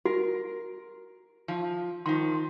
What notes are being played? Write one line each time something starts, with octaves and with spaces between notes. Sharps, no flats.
F#4 A#4
F3
D#3 F3 C6